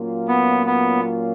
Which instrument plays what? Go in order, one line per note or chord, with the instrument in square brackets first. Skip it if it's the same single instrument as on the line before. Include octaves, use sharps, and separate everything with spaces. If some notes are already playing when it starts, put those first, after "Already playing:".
Already playing: [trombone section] A#2 F#3 A#3 C#4 F4
[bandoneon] B3
B3